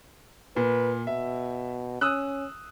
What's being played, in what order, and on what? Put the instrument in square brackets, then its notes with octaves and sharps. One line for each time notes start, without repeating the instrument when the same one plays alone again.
[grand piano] A#2 [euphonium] B4
[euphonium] B2 [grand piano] E5
[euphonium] C#4 [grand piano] D#6 E6 F#6